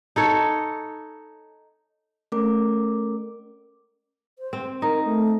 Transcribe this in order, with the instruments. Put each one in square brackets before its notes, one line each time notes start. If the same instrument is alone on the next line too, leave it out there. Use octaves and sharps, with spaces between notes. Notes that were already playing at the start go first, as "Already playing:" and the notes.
[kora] D#4 A4 C#5
[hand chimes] A3 C#4 A#4 D6
[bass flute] C5
[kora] C4
[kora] D#4 [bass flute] A#4
[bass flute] A3